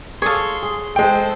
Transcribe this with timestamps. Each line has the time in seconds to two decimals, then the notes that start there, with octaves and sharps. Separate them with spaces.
0.22 G#4 A4 C#5 F5 C6
0.63 G#4
0.96 G#3 A4 C5 G5